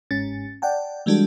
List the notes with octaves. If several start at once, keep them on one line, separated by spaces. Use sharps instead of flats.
G1 G#2 C#4 A6
D5 F#5 G5 A5
E3 G3 G#3 D4 F#4 A4